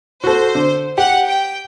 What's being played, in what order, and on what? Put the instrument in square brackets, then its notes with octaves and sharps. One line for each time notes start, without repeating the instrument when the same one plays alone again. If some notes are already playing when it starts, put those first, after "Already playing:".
[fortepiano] F#4 A4 [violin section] C5
[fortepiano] D3
[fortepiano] G4 [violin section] F#5
[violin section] G5